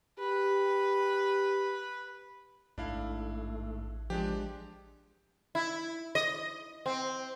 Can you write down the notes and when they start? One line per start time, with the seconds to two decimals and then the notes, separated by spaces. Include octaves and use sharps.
0.19 G4 B4
2.78 A1 G#2 A3 D4 E4 F5
4.10 F3 G#3 D4 G4
5.55 E4
6.15 D#5
6.86 C4